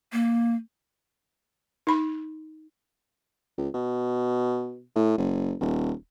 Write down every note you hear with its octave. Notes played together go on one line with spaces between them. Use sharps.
A#3
D#4 B5
C#2
B2
A2
F#1
D#1